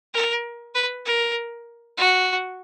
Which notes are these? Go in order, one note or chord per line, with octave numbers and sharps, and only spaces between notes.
A#4
B4
A#4
F#4